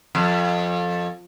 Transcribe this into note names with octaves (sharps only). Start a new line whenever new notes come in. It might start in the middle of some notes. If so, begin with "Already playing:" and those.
F2